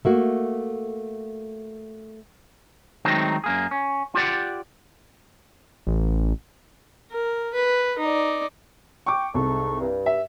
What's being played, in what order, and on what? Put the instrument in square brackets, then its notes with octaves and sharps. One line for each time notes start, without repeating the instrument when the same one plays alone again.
[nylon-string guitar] A3 A#3 F#4
[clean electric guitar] D#3 F#3 G#3 A3 C4 D#4
F#2 A#3 G#4
C#4
F4 G4 D5 F#5
[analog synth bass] A1
[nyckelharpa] A#4
B4
D#4 D5
[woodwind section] G5 [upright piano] C#6 D6
[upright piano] C2 [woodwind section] G#2 A4 C#6
[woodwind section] G2
[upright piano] E5